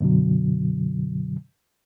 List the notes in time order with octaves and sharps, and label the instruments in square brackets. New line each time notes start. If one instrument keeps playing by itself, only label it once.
[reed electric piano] F#2 B2 D3 F#3